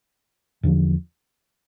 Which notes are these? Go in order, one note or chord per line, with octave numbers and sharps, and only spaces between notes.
E2 D3 F3